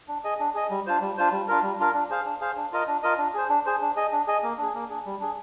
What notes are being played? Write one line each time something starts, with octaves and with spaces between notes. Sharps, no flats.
D4
G#4 D#5
D4
G#4 D#5
G3
D4 F4 C5
G3
D4 F4 C5
G3
D4 F4 A#4
G3
D4 F4 A#4
D4
G#4 C5 F5
D4
G#4 C5 F5
D4
F4 A#4 D#5
D4
F4 A#4 D#5
D4
G#4 C5
D4
G#4 C5
D4
G#4 D#5
D4
G#4 D#5
A#3
D4 G#4
A#3
D4 G#4
G3
D4 G#4